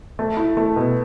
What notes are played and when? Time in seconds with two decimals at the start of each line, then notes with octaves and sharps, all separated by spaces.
0.19 A3
0.37 E4
0.57 A3
0.76 B2